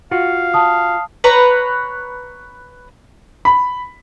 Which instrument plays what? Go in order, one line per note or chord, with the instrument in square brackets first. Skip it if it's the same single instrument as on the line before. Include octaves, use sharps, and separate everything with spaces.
[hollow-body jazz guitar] F4 F#4 [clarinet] F5
[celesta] A5 D#6
[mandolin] B4 C#5 A#5
[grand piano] B5